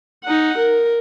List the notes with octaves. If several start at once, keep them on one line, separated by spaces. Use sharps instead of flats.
D#4 F#5
A#4